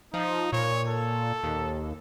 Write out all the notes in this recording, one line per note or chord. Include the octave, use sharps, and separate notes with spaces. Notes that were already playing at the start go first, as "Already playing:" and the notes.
F3 D#4
A#2 C#5
A4
D#2